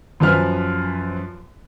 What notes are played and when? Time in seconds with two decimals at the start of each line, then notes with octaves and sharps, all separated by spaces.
0.20 F#2 F3 B4 F6